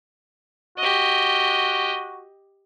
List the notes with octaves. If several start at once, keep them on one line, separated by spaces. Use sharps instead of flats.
F#4 G4 D#5